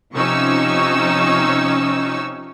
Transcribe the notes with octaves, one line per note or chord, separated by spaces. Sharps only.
C3 F3 C#4 D#4 C#6 E6